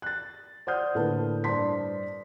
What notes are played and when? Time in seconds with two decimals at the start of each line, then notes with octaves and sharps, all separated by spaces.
0.02 F#6 A6
0.67 C5 D5 F#5 D#6 F6 G6
0.95 D2 A2 A#3 B4 A5
1.44 G2 C5 D5 A5 C6 B6